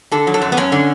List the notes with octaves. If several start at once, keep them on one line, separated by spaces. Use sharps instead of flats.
D3 A4
F#3
A4
F#2
B3
F#2 C#4
D3